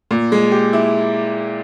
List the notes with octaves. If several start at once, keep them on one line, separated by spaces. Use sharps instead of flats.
A#2
G#3
G4
E4